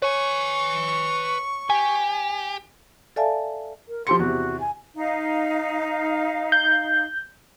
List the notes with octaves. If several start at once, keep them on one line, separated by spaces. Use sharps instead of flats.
B4 C#5 G#5 C#6
G4 G#5
A4 D5 E5 F5 G#5 A5
A#4
F3 G4 C6 C#7
E2 C3 F#4
G#5
D#4 F5
G6